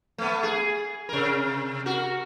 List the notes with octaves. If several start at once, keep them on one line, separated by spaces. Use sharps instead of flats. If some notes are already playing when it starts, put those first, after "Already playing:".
A3 B3
G#4
C3 A#4
F#4 A#4